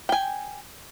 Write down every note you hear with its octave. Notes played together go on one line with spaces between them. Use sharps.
G5 G#5